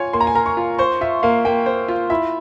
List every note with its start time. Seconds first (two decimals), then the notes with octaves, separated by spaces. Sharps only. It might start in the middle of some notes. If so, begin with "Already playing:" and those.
Already playing: F4 C#5 G#5
0.13 A#3 C6
0.21 A#5
0.27 G#5
0.35 A#4 A#5
0.46 C#6
0.57 F4
0.79 C5 C#6
1.01 F4 E5
1.23 A#3 F5
1.45 A#3 G5
1.66 C5
1.88 F4
2.10 E4 E5